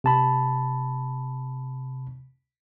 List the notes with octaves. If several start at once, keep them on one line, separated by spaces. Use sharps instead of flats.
C3 A5 B5